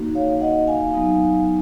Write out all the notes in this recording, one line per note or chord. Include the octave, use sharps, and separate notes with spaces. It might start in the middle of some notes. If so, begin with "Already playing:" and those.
Already playing: A#3 D#4 F#4
C#5 F5
D#5 F#5
F5 G#5
F#3 B3 D#4